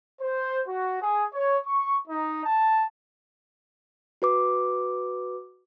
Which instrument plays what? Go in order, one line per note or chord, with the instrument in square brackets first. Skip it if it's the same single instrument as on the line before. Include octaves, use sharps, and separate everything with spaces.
[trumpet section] C5
F#4
G#4
C#5
C#6
D#4
A5
[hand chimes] F#4 B4 D6